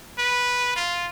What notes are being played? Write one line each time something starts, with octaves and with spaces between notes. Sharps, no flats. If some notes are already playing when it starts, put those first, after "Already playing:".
B4
F4